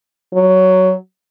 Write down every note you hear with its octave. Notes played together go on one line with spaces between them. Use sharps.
F#3